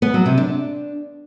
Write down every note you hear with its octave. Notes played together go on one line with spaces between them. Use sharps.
B3
F#3
C3
D4